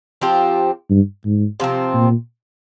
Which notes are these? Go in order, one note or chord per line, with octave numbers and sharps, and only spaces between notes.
F3 C4 G4
G2
G#2
C3 F3 C4
A#2